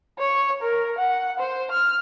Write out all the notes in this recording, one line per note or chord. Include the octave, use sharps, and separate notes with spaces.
C#5
A#4
F#5
C5
F6